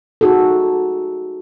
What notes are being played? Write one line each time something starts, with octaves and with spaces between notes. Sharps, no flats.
D#4 F#4 G#4 A4